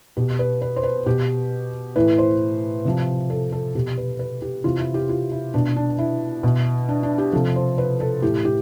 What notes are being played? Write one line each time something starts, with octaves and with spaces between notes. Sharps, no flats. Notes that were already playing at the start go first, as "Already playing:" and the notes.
B2 G4
B4
B4
C5
B4
B2 G4
A2 E3 B4
C5
C3 F3
A4
A4
B2 G4
B4
B4
G4
C3 E3 F4
E4
G4
F4
E4
B2 D4
D4
E4
B2
D4
D4
G4
C3 F3 A4
C5
B4
A4
A2 E3 G4
G4